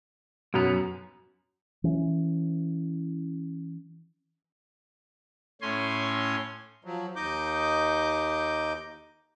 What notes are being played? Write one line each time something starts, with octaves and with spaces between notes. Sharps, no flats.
B1 F#2 B3 F7
E3 C#4
A2 C#4 G#5 C6
F3 F#3
D#2 D#4 D#5 D6 G6